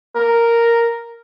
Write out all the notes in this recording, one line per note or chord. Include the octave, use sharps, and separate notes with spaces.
A#4